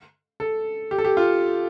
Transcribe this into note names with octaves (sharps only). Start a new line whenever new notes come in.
A4
G4
A4
G4
F4